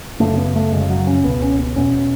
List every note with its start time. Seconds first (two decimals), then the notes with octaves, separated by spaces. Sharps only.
0.20 F#2 C#3 A3
0.38 B3
0.56 A3
0.73 F#2 C#3 G#3
0.90 F#3
1.07 C#4
1.24 C#2 B2 B3
1.42 C#4
1.59 B3
1.76 E2 B2 C#4